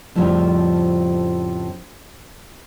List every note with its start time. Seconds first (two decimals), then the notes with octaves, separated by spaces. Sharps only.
0.15 F2 A2 C#3 F3 G3